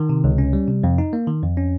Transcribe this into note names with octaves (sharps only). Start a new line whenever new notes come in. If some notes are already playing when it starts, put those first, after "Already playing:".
Already playing: D#3
C3
C#2
C#4
G3
C3
F2
D#4
A#3
D#3
F2
C#4